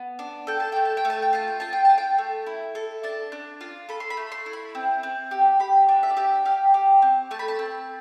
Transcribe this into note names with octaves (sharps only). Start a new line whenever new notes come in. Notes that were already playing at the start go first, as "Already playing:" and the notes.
Already playing: B3
D4
A4 G5
A5
A3 G5
A5
G5
A3
A5
G5
F4 A5
G5
F4 A5
G5
F4 A5
G5
A3
E4
A4
D4 A5
D4
F4
A4 B5
C6
B5
A3
C6
E4
B5
C4
C4
G4
G4 B5
D4
E5
D5
G4 E5
G4 F5
G4
C4
A3 A5
B5
A5
C4